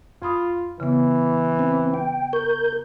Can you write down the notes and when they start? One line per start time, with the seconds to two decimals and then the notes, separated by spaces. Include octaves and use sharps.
0.22 F2 F4 B5 D#6
0.80 C#3 E3 B3
1.59 C4
1.94 G5
2.33 A#4 C#6 G6